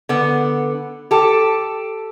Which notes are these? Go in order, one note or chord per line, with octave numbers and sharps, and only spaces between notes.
D3 B3
G4 A4